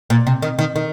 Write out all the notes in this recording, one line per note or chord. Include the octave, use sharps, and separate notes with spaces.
A#2
C3
D#3
D#3
D#3